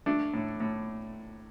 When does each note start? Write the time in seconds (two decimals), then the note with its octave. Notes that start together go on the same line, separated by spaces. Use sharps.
0.06 A3 D4
0.34 A2
0.60 A2